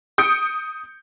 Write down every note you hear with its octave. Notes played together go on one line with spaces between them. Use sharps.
D#6 G6 C#7 D7